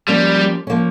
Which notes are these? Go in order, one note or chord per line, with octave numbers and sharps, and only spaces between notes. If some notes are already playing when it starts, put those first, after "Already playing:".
F3 G3 A#3 C#4
F3 A#3 C#4